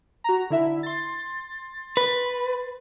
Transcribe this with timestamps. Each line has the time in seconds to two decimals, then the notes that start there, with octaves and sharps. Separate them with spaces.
0.24 F#4 A#5
0.50 D3 E4 E5
0.83 C6 A6
1.97 B4